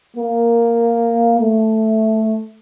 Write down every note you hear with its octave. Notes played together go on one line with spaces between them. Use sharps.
A#3
A3